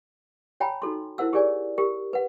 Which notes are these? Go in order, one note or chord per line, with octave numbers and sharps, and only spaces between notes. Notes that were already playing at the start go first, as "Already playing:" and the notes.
C#5 G5 G#5 A#5 B5
D#4 F#4 A4 C6
E4 A#4 C5 F#5 E6
G4 G#4 A#4 C#5 D5 G#5
G4 A#4
B4 F#5